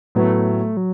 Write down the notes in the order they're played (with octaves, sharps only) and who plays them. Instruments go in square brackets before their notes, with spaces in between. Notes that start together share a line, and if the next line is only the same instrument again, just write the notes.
[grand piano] A2 F#3 B3 [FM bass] A3
[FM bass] F#3